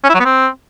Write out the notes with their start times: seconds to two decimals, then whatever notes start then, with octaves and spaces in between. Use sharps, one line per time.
0.04 C#4
0.09 E4
0.15 F#3
0.20 B3
0.25 C4